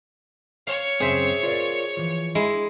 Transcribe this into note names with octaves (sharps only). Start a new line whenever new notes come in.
C#5 F5
F#2 C#3 C4 G#4 C5 E5
F4 A#4 D5
E3 F3
G#3 E4